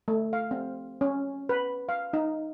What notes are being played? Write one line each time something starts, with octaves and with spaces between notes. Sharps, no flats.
A3
F5
C4
C#4
B4
F5
D#4